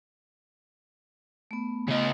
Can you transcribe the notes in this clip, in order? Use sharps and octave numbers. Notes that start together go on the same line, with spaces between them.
A3 B3
C#3 D#5